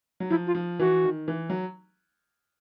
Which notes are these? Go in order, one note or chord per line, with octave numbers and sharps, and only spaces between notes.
F#3
F3 E4
F4
F3
E3 F#4
D#3
E3
F#3